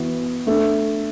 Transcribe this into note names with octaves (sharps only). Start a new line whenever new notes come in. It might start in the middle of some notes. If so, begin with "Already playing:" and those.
Already playing: E3 B3 F#4 B4
A3 D4 A4